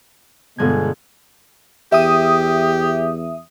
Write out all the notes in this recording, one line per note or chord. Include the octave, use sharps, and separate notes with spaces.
G1 B2 G#3 B3 G#6
E2 G4 E5 D#6